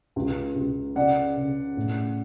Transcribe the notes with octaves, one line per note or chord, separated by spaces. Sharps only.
C#2
C#2
C#3 D5 F#5
C#3
A2